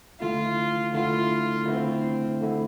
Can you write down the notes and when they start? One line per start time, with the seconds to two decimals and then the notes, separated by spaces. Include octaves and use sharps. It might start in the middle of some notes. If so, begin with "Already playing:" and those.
0.20 D3 A3 E4 F4
0.94 D3 A3 E4 F4
1.67 D3 A3 C4 E4
2.41 D3 A3 E4